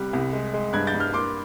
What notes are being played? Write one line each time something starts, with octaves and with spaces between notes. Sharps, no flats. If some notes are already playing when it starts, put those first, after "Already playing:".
Already playing: C2 C3 G3 F#6
C2
G#3
G#3
G2 F#6 G#6
G6 A6
G2
F6 G6
A#3 C6 D6